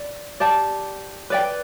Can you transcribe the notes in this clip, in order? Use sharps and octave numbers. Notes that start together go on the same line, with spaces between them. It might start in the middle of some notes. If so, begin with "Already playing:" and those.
Already playing: D5
G4 D5 A5
B4 D5 G5